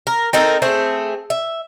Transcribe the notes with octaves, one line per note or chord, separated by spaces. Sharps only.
A#4
C4 D#4 A4 A#4
A3 C4 G#4
E5